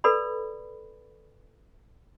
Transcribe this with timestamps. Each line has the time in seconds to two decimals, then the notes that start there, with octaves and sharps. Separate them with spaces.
0.04 A4 B4 D5 B5